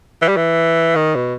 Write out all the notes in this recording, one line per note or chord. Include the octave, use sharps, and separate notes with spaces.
E3
G3
E3
D#3
B2